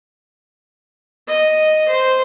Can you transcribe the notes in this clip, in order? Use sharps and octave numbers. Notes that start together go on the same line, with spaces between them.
D#5
C5